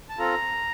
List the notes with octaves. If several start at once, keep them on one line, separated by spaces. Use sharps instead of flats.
A5
C4 F4 A4 A#5